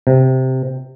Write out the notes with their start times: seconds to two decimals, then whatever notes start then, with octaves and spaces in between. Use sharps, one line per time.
0.07 C3